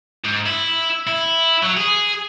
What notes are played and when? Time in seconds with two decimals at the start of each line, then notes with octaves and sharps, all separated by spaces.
0.24 G#2
0.46 E4
1.07 E4
1.63 F#3
1.77 G#4